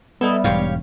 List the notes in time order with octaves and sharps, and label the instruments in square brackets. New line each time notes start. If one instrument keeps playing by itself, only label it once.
[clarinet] G3 [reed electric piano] B3 [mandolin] D#4 E4 A4
[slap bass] E1 G#2 [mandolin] G4 C#5 F5